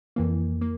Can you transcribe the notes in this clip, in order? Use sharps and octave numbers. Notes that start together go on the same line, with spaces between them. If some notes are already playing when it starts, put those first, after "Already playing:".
F2 E3 A#3
A#3